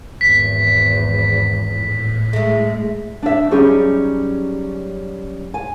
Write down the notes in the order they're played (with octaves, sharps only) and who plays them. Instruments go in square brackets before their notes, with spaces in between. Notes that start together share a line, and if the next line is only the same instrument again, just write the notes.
[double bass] G#1 E2 [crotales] B6
[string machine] A2
[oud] G#3 A3
[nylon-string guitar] D4 E5
F#3 G3 C#4 D#4 G4 G#4
G#5